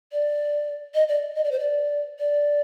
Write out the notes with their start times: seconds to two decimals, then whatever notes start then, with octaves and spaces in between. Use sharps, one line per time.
0.12 D5
0.94 D#5
1.08 D5
1.36 D#5
1.44 D5
1.51 C5
1.59 D5
2.19 D5